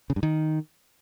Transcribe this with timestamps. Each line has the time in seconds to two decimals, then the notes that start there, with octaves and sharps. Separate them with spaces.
0.10 C#3
0.16 G2
0.23 D#3